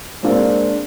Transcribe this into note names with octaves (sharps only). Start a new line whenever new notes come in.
G#3 A#3 C4 D4 F5